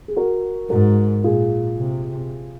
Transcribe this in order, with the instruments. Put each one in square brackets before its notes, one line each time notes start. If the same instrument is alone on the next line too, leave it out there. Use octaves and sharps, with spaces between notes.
[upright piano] G#4
F#4 A#4
[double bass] G#2 [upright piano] F#4 A#4
[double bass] A#2 [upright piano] F4 G#4
[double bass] C3